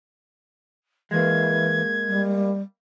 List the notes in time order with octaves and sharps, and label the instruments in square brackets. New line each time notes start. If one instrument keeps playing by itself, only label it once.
[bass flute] E3 [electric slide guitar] G#3 A#3 [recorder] G#6
[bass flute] G3